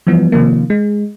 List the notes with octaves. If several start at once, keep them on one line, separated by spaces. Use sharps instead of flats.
E3 F3 G3 B3
C3 D#3 F3 A#3
G#3